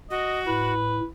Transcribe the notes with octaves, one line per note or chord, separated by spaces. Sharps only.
F#4 D#5
A2 B4